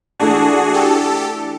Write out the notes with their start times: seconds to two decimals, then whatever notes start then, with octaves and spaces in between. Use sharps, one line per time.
0.19 E3 A3 D4 F#4 G#4
0.74 G4 A4